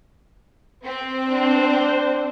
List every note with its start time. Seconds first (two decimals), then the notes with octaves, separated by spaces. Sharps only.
0.85 C4
1.29 D4 C5